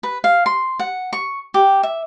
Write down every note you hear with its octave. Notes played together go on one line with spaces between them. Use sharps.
B4
F5
C6
F#5
C#6
G4
E5